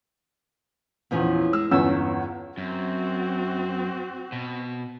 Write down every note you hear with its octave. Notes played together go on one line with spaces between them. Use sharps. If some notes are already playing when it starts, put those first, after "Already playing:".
A#1 E2 E3 F3 C#4
G#3 E6
G1 E2 B3 C#4 E6
F#2 C4 F#4
B2